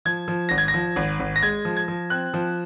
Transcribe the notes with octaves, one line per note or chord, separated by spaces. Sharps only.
F3 G#6
F3
G#1 A#6
G#6
A#6
F3
G#1
G#1
A#6
G#3 G#6
F3
G#6
F3
C4 F#6
F3